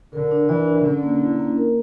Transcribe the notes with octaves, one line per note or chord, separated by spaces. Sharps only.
D3 A#4
D4
E3 D5
D4
D3 C#4
A#3
E4
A#3
A#4